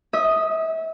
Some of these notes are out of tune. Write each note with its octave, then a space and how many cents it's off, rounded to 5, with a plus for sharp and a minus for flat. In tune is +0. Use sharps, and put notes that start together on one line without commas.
E5 -35 D#6 +0